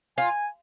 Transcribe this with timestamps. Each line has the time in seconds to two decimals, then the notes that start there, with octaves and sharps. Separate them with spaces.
0.18 F4 G#5